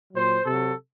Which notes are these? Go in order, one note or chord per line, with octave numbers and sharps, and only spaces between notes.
A#2 F#3 C5
C3 A4
F#3